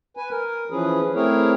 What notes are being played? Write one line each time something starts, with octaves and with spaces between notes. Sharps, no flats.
B4 G#5
A#4
E3 F3 C#4 G#4 B4
A3 C4 E4 G#4 A#4 C#5